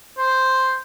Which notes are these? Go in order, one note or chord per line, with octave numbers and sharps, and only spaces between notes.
C5